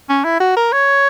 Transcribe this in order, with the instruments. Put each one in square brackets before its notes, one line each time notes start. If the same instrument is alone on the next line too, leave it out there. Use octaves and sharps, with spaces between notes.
[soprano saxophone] C#4
E4
F#4
A#4
C#5